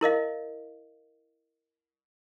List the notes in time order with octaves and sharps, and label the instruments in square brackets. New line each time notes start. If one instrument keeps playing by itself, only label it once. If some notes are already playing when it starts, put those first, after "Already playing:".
[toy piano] E4 A#4 D#5 F5